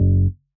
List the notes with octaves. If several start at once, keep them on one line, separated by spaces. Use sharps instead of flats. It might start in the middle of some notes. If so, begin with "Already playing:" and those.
Already playing: F#1